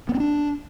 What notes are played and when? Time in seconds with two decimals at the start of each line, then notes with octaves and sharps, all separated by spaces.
0.09 B3
0.14 C4
0.20 D4